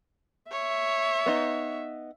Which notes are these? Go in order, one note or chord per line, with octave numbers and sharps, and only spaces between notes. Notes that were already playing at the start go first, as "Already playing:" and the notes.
C#5 E5
B3 D#4